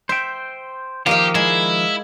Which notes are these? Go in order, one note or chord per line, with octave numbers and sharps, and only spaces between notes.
C5 E5 G5
D#3 F3 A#3 G4 D#5 F5
G#3 E4